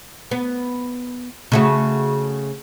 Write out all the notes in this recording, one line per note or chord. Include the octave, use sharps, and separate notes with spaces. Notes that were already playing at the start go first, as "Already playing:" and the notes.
B3
C#3 A3 F#4